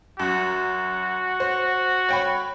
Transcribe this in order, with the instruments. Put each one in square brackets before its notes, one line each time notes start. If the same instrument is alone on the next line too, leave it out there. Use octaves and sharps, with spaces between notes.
[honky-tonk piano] F#2 [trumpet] F#4
[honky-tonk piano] C5
C#5 G5 B5